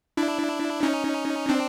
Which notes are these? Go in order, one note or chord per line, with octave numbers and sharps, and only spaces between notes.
D4 E4
C#4 D#4
C4 D4